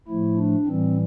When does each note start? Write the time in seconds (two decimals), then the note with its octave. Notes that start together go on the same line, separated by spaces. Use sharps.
0.08 A2 F3 A3 E4
0.37 D4
0.66 A2 E3 G3 C4